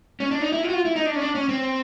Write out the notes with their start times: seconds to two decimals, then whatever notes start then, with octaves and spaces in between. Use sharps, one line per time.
0.20 C#4
0.31 D4
0.41 D#4
0.52 E4
0.63 F4
0.69 F#4
0.73 F4
0.85 E4
0.96 D#4
1.06 D4
1.16 C#4
1.21 D4
1.35 C#4
1.49 C4